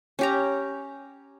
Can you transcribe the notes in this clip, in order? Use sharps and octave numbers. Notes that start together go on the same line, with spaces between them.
C#4 G4 A#5